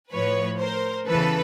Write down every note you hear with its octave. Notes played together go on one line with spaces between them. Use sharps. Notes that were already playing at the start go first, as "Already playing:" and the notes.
A2 F3 B4 C#5
A#4 C5
E2 C#3 E3 A4 B4